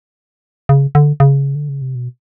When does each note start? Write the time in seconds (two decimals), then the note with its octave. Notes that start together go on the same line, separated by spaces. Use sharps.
0.69 C#3
0.95 D3
1.20 C#3
1.55 D3
1.69 C#3
1.82 C3
1.95 B2